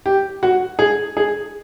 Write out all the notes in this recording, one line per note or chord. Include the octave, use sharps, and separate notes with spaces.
G4
F#4
G#4
G#4